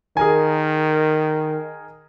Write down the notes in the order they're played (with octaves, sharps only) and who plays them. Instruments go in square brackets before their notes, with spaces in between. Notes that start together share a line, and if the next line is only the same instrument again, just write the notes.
[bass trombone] D#3 [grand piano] G#4 A#4 G#5